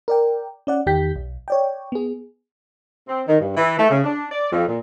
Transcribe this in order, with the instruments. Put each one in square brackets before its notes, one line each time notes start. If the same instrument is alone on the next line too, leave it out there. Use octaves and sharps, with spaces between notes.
[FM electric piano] A#4 D5 G5
C#4 D5 F#5
E2 D#3 G4 G5 G6 B6
B1
C#5 D5 G5
B3 G#4
[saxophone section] C4
D#3
G2
E3
A3
C#3
D4
D5
F2
A#2